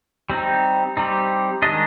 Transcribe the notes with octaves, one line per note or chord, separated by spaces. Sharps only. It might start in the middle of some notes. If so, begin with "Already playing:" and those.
G3 C4 D#4
G3 C4 D#4
D#3 G#3 D4 D#5